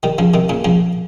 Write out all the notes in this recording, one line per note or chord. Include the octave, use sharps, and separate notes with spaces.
D#3 G3
C#3 F3
C3 D#3
A#2 C#3
C#3 F3